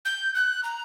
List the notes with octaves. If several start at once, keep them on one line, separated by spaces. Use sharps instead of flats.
G6
F#6
A#5